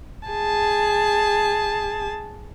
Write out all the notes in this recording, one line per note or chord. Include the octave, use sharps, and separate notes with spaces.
G#4 A5